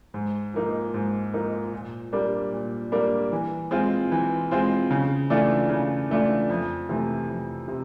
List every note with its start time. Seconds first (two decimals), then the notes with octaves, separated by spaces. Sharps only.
0.14 G#2
0.54 F3 A#3 D#4
0.94 G#2
1.34 F3 A#3 D#4
1.73 A#2
2.13 G3 A#3 D4
2.52 A#2
2.92 G3 A#3 D4
3.32 E3
3.71 G#3 C4 F4
4.12 E3
4.51 G#3 C4 F4
4.91 C#3
5.30 E3 A3 D4 F4
5.69 C#3
6.10 E3 A3 D4 F4
6.50 F2
6.89 C3 E3 A3
7.29 F2
7.68 C3